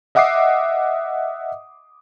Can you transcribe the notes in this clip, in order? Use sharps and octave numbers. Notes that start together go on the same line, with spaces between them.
D#5 E5 F#5 D6 D#6 C7